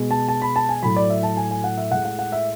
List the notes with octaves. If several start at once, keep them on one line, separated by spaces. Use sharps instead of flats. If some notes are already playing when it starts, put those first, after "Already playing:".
Already playing: B2 G#3
A5
A5
B5
A5
G#5
A2 F#3 B5
D5
E5
A5
G#5
G#5
F#5
E5
A2 G#3 F#5
F#5
F#5
E5